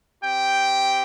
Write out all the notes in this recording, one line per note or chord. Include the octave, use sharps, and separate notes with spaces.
C4 G4 G5